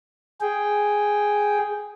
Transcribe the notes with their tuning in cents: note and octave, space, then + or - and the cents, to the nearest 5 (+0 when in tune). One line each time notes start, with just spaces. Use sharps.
G#4 +0 G5 +0